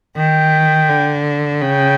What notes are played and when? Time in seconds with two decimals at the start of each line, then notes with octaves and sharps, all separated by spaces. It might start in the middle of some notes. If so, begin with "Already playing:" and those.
0.16 D#3 G5
0.89 D3
1.62 C#3 G5